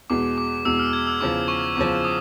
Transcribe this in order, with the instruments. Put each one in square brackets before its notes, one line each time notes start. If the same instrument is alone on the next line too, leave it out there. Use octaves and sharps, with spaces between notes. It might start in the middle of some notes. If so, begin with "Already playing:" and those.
[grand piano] E2 B2 G#3 [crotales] D6
[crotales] D6
[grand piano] E2 B2 G#3 [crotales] E6
[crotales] F6
G#6
E6
[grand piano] E2 C#3 F3 [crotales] D6
[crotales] C#6
[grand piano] E2 C#3 F3 [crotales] D6
[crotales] D#6